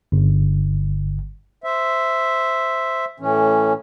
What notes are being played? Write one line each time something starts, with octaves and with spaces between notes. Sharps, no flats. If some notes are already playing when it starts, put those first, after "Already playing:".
G1
C5 E5
A2 E3 C#4